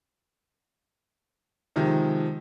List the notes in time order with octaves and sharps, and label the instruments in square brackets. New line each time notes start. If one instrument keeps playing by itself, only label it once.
[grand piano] C3 D#3 F3 G#3